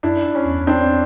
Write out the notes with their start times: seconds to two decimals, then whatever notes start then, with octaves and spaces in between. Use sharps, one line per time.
0.03 F#2 D4 E4
0.35 C#4
0.45 E2
0.67 C4 D4